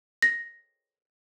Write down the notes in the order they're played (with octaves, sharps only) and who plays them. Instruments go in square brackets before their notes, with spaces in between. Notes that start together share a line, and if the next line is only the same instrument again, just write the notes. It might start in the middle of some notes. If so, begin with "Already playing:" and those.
[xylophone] A#6